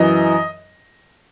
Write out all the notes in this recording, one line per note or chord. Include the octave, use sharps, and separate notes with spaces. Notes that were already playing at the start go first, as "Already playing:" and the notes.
Already playing: F#2 E3 D#5